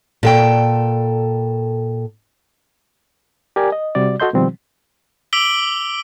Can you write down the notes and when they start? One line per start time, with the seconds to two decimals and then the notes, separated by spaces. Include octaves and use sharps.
0.23 A#2 A4 G5
3.56 G4 A#4 D5 G#5
3.72 D#5
3.95 C3 G3 F#4 D5
4.20 F#4 A4 D#5 C6 G6
4.33 B2 D#3 F3 G3 C4
5.33 D6 E6 B6 D7 F#7 G7